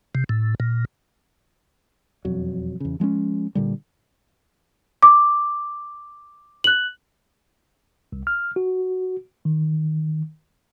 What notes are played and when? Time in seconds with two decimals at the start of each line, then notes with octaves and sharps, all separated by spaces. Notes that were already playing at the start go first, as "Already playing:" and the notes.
0.15 C3
0.29 A2
0.60 A#2
2.25 E1 F2 F#3
2.80 E2 C#3
3.00 F3 G#3 B3 C#4
3.55 A#2 D3 G3
5.03 D6
6.64 F#6 F#7
8.13 C2
8.27 F6
8.56 F#4
9.45 D#3